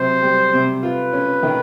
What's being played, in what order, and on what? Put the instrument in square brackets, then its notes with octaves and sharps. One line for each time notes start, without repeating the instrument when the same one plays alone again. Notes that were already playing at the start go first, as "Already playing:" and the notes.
Already playing: [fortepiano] C3 F#3 [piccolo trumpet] C5
[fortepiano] G3
C3
[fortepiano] F4 [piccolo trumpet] B4
[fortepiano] C#4
D#3